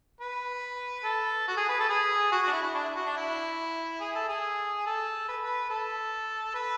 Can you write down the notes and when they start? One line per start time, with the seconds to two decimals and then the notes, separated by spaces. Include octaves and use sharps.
0.20 B4
1.04 A4
1.48 F#4
1.57 G#4
1.69 B4
1.79 A4
1.89 G#4
2.32 F#4
2.42 D4 F#4
2.53 E4
2.63 E4
2.74 D4
2.84 E4
2.96 F#4
3.06 D4
3.17 E4
4.00 G#4
4.15 A4
4.29 G#4
4.86 A4
5.28 B4
5.42 B4
5.70 A4
6.55 B4